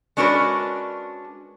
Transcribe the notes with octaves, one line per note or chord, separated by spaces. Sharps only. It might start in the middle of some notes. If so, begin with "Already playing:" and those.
G#3 C#4 D4 F#4 A#4 B4